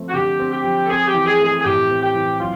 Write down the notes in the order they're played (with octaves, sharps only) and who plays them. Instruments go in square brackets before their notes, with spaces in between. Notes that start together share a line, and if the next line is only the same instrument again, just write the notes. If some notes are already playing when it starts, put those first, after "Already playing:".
Already playing: [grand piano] F3 A3 C4
[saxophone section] F#4
[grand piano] D3 [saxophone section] G4
[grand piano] C4
[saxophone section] G4
[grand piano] F3
[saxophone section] A4
[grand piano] C4 [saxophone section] G#4
[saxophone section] G4
[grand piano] E3
[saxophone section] G#4
[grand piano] A3
[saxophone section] G#4
G#4
[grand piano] A2 [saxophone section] G4
[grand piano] C4
[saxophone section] G4
[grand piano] E3
[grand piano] F#3 [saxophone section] F4